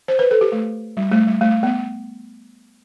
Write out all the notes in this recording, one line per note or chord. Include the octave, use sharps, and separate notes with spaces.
C5
B4
A4
G4
A3
G3
A3
G3
A3
B3